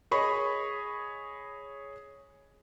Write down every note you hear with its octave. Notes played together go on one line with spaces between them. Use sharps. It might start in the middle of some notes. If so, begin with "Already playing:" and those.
G#4 C#5 D#5 B5 C#6